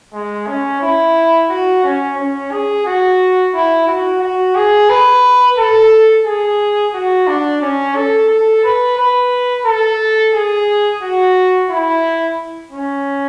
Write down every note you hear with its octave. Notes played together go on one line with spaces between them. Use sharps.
G#3
C#4
E4
F#4
C#4
C#4
G#4
F#4
E4
F#4
F#4
G#4
B4
A4
G#4
F#4
D4
C#4
A4
A4
B4
B4
A4
G#4
F#4
E4
C#4